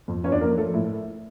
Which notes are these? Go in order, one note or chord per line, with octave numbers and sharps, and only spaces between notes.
F2
E2 C#4 C#5
D4 D5
F3 A#3 A#4
F3 A3 A4
A2 E4